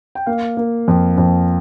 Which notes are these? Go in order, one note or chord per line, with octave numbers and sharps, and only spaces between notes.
G5
A#3 F5
A#3
F2
F2